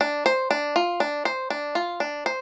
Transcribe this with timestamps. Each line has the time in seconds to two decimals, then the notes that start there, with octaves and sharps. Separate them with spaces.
0.01 D4
0.26 C5
0.51 D4
0.76 F4
1.00 D4
1.25 C5
1.50 D4
1.75 F4
2.00 D4
2.26 C5